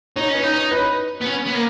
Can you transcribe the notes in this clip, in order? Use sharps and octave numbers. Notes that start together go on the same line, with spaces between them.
D#4 C#5
C#4
B4
D#4
C#5
B4
B3
C#4
B3
A#3